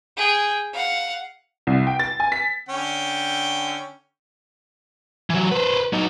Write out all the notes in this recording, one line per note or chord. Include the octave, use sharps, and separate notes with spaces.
G#4 G5
F5 F#5
C2
G5
A6
G#5
B6
D3 C#4 G5
E3 F#3
B4 C5
F#3 D#4